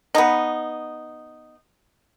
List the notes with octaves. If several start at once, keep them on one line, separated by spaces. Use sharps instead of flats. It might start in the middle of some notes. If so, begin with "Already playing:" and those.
B3 D#4